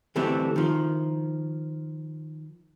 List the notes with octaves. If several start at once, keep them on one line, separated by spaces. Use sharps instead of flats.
D3 E3 G3 A3 C4 D4
D#3 F3